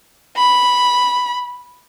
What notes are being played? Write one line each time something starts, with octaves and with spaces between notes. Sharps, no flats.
B5